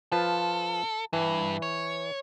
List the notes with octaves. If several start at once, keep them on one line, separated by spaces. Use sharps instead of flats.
F3 F4 A4 B4
G2 E3
C#5